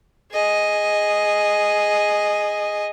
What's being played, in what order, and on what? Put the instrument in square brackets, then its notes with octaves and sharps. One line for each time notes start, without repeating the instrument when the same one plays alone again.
[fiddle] G#4 D#5